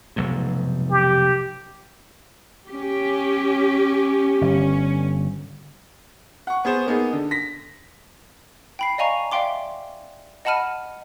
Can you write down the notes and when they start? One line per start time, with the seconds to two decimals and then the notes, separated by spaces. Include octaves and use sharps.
0.16 F1 B1 G#2
0.91 G4
2.68 C#4 G4
4.41 G1 C#4
6.47 F#5 C#6
6.65 B3 G#4 C5
6.86 A#3 B3 D#4 G#4
7.13 D3
7.31 A#6 B6
8.79 G5 B5 C7
8.98 D5 D#5 F5 G#5 A#5 C#6
9.32 D5 E5 F5 G5 C6 D6
10.45 D#5 F#5 A5 B5 F6 D#7